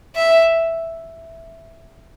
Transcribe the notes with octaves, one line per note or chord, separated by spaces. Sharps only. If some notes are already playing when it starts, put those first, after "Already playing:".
E5